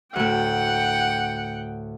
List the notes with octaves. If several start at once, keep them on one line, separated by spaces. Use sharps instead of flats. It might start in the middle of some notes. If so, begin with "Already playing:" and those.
D2 A2 F#5 G5